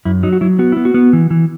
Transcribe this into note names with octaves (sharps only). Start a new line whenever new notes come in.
F#2 E4
F#3 D#4
F#4
F#3 E4
B3 F#4
B3 E4
F#4
B3
E3
E3